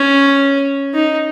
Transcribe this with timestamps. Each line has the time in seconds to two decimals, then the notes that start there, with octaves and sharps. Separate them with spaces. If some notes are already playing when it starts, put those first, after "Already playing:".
Already playing: C#4
0.94 D#4